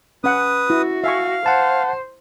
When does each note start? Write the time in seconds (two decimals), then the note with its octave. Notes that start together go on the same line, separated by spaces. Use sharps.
0.24 C#4 B4 F#5 D#6
0.70 E4 F#4
1.04 E5 F5 G#5 C#6
1.46 C5 F#5 A5